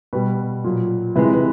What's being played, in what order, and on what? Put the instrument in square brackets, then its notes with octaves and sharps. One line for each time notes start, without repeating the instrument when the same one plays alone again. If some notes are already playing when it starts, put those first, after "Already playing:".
[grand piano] B2 G3 B4
A#2 F#3
C3 E3 G#3 B4
B4